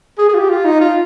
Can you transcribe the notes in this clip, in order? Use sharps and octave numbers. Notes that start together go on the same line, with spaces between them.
G#4
G#4
F4
G4
F4
D#4
F4